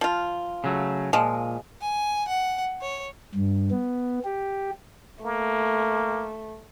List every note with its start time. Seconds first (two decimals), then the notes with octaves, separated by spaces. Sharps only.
0.01 F3 F4
0.64 C#3 F#3 A3
1.13 A#2 F3 G#3
1.82 G#5
2.28 F#5
2.81 C#5
3.35 G2
3.71 B3
4.24 G4
5.25 A3 A#3